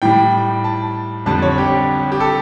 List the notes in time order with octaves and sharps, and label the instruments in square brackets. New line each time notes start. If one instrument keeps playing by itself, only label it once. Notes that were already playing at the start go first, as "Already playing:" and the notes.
[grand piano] A2 G3 G5
A5
F2 D3 G3 A5
C#5
G4
G4
A4